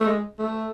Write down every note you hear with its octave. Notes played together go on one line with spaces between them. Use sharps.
A3
G#3
A3